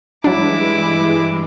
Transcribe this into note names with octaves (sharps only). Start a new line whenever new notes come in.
G2 E3 F#3 G#3 D4 E4 D6